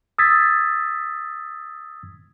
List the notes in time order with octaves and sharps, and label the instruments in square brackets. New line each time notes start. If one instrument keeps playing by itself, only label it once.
[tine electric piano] D#6 E6 G#6 A6 B6